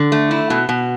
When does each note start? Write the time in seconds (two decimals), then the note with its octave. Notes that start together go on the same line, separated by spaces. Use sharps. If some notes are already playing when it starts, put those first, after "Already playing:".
Already playing: D3
0.12 A3
0.31 E4
0.50 B2
0.69 B2